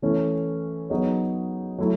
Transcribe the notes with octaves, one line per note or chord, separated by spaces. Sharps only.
E3 A3 C#4 E4
F#3 B3 D#4 G#4 C#5
F#3 A3 E4